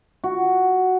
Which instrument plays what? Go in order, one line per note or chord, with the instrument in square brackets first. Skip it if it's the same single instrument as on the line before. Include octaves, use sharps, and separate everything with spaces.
[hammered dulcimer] F#4